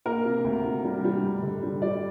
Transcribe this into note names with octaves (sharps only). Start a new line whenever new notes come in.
A#3 A#4
C3
D2
C3
G3
G3
G2
D3
G3
G3 D5